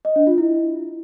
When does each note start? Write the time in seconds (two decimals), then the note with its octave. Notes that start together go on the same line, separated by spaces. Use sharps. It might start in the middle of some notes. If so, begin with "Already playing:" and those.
0.05 D#5
0.16 D4
0.27 F4
0.38 E4